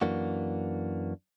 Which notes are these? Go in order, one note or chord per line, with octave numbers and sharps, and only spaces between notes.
F#2 E3 A#3 D4 F#4